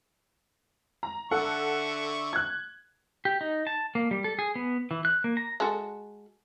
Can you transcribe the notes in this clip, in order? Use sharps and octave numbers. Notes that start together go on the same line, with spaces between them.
A#5
D3 A4 E5 F#5 C#6
F#6 G#6
G4
D#4
A5
A#3
G3
A4
G#4
B3
E3
F#6
A#3
A#5
G#3 F#4 A4